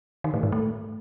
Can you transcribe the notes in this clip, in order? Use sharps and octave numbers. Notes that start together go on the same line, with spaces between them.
D#3
A2
G#2
A3